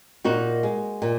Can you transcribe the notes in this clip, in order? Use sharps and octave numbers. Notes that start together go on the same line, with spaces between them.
A#2 D#4 F#4
G#3
A#2